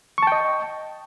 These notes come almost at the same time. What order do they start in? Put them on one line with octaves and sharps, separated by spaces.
C#6 A5 G5 D#5